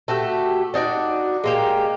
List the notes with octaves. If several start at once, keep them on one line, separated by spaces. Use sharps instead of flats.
A3 F#4 G4 E5
D4 D#4 F#4 D5
G#3 A#3 G4